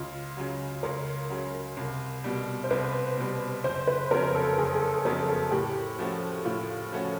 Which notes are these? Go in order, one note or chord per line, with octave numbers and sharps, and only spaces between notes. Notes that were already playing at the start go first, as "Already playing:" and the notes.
Already playing: C#2 F4
C#3 F#3
C#2 A#4
C#3 F#3
C2
B2 G3
C5
C2 B4
B2 G3
F#1 C5
B4
F2 C#3 F#3 B3 A#4
A4
F#1 G#4
G#4
A4
F2 C#3 F#3 B3 A#4
A4
A2 G4
F3 A3 C#4 F#4
A2 F4
F3 A3 C#4 F#4